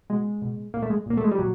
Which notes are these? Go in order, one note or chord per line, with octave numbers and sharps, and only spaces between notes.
B2 G#3
B2
A#2 A#3
A3
G#3
A#2 A#3
A3
G#3
G3
A#2 F#3